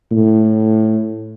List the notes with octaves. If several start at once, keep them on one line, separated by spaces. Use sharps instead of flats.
A2